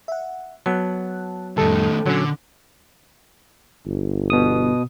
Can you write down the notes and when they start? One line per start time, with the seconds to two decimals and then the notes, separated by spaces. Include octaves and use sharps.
0.08 E5 F#5
0.66 F#3 B3 A5 F#6
1.58 F2 A2 D#3 G3 A3 A4
2.06 A#2 D3 F#3 C#4
3.86 G1
4.30 B2 D#6